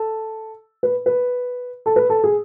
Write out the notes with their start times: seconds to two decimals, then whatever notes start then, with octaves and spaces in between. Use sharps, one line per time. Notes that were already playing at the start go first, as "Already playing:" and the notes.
Already playing: A4
0.83 B4
1.06 B4
1.86 A4
1.96 B4
2.10 A4
2.24 G#4